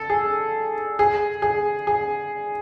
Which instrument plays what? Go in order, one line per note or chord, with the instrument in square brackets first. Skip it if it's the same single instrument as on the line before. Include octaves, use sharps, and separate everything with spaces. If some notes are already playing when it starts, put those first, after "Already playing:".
Already playing: [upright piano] A4
G#4
G#4
G#4
G#4